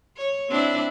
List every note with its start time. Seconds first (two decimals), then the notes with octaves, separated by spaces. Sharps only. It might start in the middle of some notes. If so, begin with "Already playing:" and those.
0.16 C#5
0.49 C4 D4 E4